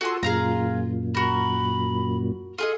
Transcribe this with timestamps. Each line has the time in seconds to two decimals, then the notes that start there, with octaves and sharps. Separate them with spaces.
0.01 F4 F#4 G#4 A4 C6
0.23 F#2 A#2 G#4 F5 A#5
1.15 F#4 A#4 B5
2.58 F4 G#4 A4 D#5